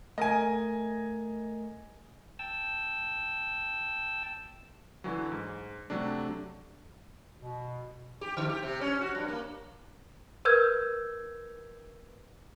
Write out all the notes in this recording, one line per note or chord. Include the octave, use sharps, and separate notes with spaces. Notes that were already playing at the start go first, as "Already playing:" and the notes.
A3 A#4 D#5 G#5
G5 A5 E6
D3 E3 F#3
G#2
C3 F#3 A3 D4
B2
G4
D3
G4
C3
C#4
F#4
G2
A#3
A#4 B4 E6 G6 G#6